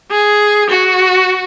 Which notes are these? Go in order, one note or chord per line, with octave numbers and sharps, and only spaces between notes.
G#4
F#4